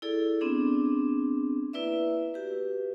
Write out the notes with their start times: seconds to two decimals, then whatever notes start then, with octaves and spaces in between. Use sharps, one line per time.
0.02 E4 G#4 A4 D5
0.41 B3 C4 D4 G#4
1.73 A#3 E4 B4 D5 E5
2.34 F#4 G4 B4